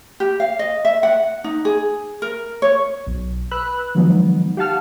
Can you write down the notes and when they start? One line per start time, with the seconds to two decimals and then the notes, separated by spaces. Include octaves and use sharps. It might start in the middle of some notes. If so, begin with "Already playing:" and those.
0.20 G4
0.40 F5
0.59 D#5
0.85 E5
1.03 F#5
1.44 D#4
1.65 G#4
2.22 A#4
2.62 C#5
3.06 B1
3.51 B4 B5 E6 F#6
3.95 D#3 F3 F#3 G#3 B3 D#4
4.57 G4 F5 F#5 A5 F6